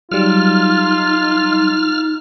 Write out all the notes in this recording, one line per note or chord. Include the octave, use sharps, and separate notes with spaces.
F#3 G3 D#4 F4 F6